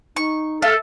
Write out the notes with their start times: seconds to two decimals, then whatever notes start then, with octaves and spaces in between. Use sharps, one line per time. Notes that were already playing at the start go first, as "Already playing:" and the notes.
0.16 D#4 C#6
0.62 A3 A4 F5